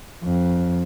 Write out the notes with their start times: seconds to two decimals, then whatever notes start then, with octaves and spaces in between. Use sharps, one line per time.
0.24 F2